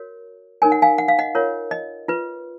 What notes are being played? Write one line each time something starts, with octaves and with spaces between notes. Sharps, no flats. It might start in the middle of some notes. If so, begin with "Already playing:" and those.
Already playing: F#4 A#4 C#5
D#4 A#4 C#5 G#5
F#5
F5 G#5
F#5
F5
D#5 F#5
F4 A#4 C#5
D#5
F4 B4